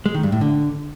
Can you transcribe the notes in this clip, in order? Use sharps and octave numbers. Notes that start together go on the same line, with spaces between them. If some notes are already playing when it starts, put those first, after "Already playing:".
G#3
D#3
G2
A2
D3